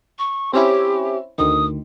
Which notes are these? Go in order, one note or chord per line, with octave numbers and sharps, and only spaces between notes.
C#6
C4 C#4 E4 G4
D2 D#3 D#6